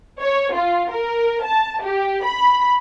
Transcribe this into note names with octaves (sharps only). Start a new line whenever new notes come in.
C#5
F4
A#4
A5
G4
B5